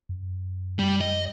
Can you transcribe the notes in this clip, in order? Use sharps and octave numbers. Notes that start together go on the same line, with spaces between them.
F#2
G3
D#5